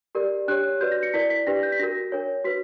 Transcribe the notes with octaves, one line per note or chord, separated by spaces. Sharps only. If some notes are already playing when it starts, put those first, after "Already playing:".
G4 A#4 D5
D4 G4 C#5 F#6
F#4 B4 D5 G6
A#6
C#7
E4 A#4 D5 B6
B6
D4 G4 B4 D5 A#6
G6
B6
D4 F#4 A#4 A#6
D4 A#4 C#5
F#4 B4 B6